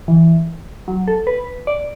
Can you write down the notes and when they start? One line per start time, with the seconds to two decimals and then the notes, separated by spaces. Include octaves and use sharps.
0.08 E3
0.88 F#3
1.08 A4
1.27 B4
1.67 D5